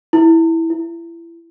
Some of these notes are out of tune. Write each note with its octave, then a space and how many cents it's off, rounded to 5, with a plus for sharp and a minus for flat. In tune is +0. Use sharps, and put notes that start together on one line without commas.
E4 -10
E4 +30